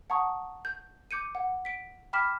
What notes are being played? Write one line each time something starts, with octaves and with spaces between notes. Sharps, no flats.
F#5 A5 A#5 C#6 D#6
G6
D6 G6 C#7 D#7
F#5
B6 D7
G5 B5 D6 F6 B6 E7